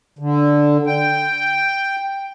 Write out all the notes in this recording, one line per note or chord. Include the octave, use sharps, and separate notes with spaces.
D3
G5